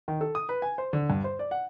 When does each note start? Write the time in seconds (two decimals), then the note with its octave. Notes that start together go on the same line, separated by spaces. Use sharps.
0.08 D#3
0.21 A4
0.35 D#6
0.49 B4
0.62 G#5
0.78 C5
0.93 D3
1.10 G2
1.24 C5
1.39 D5
1.51 F#5